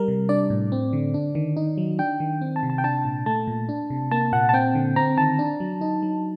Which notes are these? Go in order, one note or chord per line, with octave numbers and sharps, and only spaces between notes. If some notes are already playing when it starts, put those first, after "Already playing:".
Already playing: G3 A#4
C3
D4 D5
A2
C4
D3
D4
D#3
D#4
F#3
D4 G5
D#3
C4
A5
C3
A5
G5
D4 A5
A#2
A3 A5
A#2
D4
C3
A#3 A5
A#2 F#5
A5
C4 G5
D3
C4 A#5
D#3 A5
D4
F#3
D#4
F#3